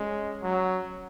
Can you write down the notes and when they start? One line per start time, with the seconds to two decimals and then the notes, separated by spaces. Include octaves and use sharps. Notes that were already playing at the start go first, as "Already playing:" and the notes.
Already playing: G#3 C#4
0.43 F#3